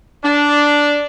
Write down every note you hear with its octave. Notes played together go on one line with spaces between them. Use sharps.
D4